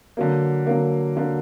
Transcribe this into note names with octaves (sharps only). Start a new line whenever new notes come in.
D3 F#3 A#3
D3 F#3 A#3
D3 F#3 A#3